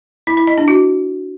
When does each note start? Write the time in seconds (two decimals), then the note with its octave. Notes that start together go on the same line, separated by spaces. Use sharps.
0.27 E4
0.37 E4
0.47 D#5
0.58 D4
0.68 F#4